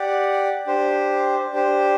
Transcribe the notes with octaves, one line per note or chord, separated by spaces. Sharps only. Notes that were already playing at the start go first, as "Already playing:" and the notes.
Already playing: G4 D5 F#5
D4 G4 C5
D4 G4 C5